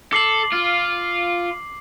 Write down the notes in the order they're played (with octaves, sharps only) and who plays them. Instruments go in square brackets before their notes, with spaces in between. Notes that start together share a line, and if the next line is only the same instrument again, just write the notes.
[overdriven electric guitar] A4 [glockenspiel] D6 C7 F#7
[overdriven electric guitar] F4